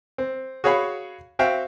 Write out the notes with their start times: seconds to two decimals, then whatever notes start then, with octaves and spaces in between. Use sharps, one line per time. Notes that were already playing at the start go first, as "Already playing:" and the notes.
0.18 C4
0.64 F#4 G#4 C#5 F5 B5
1.39 C4 F#4 E5 F5 G5